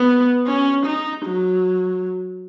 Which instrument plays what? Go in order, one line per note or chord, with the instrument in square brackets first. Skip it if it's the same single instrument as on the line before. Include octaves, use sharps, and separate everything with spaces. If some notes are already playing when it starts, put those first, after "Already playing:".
Already playing: [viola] B3
C#4
D#4
F#3